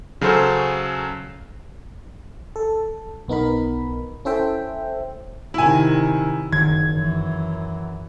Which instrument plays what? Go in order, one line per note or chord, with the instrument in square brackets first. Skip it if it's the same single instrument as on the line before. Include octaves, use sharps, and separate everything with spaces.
[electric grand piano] C#3 F#3 C#4 A4 C5
[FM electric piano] A4
B1 B3 D#4 A#4 B5
C#4 E4 A4 C5 E5 G5
[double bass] C3 D#3 [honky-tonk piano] E4 G#5
[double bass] F#1 [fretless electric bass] D#3 [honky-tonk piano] G#6
[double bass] F#2 E3